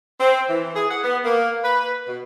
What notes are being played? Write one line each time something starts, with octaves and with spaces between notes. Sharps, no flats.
C4
E3
G#4
F#5
B3
A#3
B4
B2